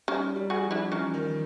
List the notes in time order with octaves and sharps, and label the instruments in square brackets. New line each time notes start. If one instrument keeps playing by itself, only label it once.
[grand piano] G3 [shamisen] C#4 D#4
[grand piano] G3
[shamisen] F#4 G#4
[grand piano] F3
[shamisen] D4 E4
[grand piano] E3 [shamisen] C#4 D#4
[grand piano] D#3